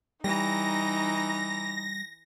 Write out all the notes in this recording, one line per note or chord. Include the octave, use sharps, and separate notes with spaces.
E3 G3 D#4 A#5 A#6